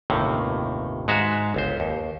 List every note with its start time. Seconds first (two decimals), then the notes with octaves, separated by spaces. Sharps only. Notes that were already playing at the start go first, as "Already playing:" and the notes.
0.10 G1 D#2 A2 C3 D#3
1.08 G#2 G#3 F#4 E5 F5
1.54 G1 C#2 C5
1.80 D#2